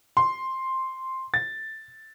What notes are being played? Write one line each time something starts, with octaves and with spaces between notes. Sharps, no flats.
C6
A6